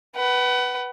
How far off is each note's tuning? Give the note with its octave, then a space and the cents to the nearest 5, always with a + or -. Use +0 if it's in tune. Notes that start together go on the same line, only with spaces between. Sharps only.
B4 +0 F#5 +30